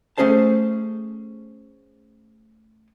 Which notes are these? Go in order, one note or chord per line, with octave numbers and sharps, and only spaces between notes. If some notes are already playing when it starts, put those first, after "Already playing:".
A3 C4 C#4 G#4 C5 A5